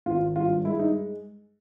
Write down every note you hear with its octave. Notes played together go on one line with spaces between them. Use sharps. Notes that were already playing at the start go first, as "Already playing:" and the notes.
G#1 F4
G2 F4
G#3 E4
D#4